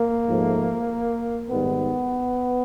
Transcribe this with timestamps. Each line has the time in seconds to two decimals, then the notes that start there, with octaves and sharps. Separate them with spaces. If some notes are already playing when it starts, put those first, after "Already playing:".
Already playing: A#3
0.27 G#2 F3 A3
1.50 G#2 D#3 G3 B3